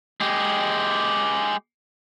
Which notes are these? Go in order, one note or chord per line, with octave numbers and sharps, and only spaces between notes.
G#3 G4